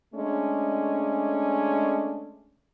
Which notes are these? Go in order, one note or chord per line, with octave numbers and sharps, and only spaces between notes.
G#3 A3 C#4 D4